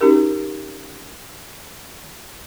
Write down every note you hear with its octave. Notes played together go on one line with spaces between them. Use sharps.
C#4 D#4 F#4 G4 A#4